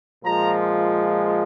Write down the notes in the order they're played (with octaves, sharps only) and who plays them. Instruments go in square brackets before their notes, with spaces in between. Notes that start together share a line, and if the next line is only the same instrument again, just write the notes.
[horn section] A#2 F3 G#3 A#5